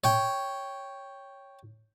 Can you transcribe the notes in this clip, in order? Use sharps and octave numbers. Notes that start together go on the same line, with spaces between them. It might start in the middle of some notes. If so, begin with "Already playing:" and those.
C#5 G5